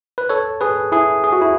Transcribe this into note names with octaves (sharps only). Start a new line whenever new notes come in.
B4
A4 C#5
G#4 B4
E4 G#4
G#4
F#4
E4